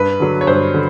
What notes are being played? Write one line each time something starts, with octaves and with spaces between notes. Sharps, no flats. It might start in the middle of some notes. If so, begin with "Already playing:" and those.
Already playing: G2 B4
D3 F#3
C#5
G2 C5
D3